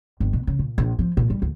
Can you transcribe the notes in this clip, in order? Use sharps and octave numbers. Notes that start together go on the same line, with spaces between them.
G1
B2
C#3
A#2
A#1
F3
A#2
G3
D2